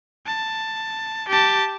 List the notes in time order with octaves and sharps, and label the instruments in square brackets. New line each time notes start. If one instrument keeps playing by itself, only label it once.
[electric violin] A5
G4 A5